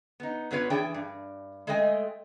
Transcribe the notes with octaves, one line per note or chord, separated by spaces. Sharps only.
B3 D#4
G2 B3 F4 B4 C#5
E3 D4 G#4 G5 A5
G2
G#3 A3 D#5 G5 G#5